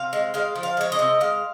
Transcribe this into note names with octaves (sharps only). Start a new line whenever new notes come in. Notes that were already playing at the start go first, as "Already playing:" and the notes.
Already playing: C3 F5
G#3
G#3 F5
F3
F5
G#3 C#5
D#5
C3
G#3 F5